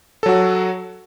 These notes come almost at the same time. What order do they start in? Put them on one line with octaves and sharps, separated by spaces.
A4 F#3 F#4